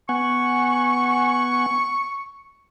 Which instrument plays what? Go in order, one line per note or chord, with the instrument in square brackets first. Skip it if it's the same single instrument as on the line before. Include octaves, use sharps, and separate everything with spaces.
[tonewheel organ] B3 F#5 G#5 [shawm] C#6